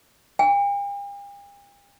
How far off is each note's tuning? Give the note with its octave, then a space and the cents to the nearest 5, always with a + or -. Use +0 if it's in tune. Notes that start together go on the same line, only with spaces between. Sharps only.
G5 +45